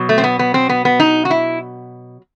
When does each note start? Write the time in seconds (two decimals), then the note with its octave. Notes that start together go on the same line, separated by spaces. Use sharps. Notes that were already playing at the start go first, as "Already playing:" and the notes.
Already playing: B2 F#3
0.09 A3
0.18 C4
0.24 B3
0.39 B3
0.54 C4
0.69 B3
0.85 B3
1.00 D#4
1.25 F#4
1.30 E4